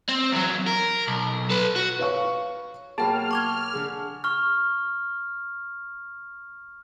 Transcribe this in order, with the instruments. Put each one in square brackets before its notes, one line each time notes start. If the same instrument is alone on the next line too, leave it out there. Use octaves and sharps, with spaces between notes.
[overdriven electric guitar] C4
E2 F#3
A#4
B1
A4 B4
F#4
[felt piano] B4 C#5 F5 C#6
[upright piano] B2 F#3 A#3 [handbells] G#4 G5 B5 [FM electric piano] A5 [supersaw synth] F6
[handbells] C#6 D6 G#6
[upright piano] D3 G#4
[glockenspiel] C#6 F6